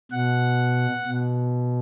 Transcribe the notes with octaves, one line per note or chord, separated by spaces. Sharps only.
B2 F#5
B2